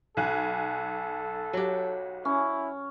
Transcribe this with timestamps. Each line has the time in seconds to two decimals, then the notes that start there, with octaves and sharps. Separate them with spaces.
0.17 B1 A4 G#5 F#6
1.53 F#3 G4
2.25 C#4 E4